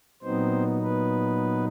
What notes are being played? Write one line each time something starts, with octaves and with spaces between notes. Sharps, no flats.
A#2 F#3 B3 C4 D#4 C5
B3 B4